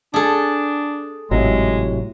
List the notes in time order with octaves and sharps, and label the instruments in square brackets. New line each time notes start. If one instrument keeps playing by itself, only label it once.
[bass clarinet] D4 [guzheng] G#4 A4
[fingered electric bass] G#1 [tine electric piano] A2 C3 F#3 [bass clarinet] G#3